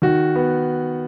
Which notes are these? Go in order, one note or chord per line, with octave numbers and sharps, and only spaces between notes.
D#3 F#4
B3